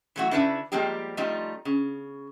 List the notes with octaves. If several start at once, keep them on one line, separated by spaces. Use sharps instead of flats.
E3 F#3 A3 E4 F#4
C#3 D4 E4 B4 E5 A5
F3 G3 G#3 A#3 C4 G4
F3 G3 A3 C4 D#4 F4
C#3